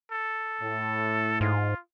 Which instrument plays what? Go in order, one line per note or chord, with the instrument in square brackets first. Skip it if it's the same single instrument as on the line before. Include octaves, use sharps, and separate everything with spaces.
[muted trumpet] A4
[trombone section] A2
[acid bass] G#2 [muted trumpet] F4